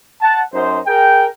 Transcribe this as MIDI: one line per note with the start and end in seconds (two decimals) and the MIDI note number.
0.22 0.42 78
0.22 0.42 81
0.53 0.79 42
0.53 0.79 63
0.53 0.79 72
0.86 1.27 68
0.86 1.27 70
0.86 1.27 79